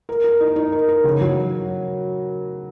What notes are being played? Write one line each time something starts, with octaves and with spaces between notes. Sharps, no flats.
A#4
A#4
D#4
D#4
A#4
A#4
C#3
F#3